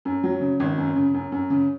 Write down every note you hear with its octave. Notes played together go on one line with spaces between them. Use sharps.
F#2
F#3
C#3
G#1
F#2
C#3
F#2
F#2
C#3